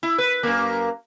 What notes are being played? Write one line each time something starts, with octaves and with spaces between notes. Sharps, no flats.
E4
B4
F#2 A#3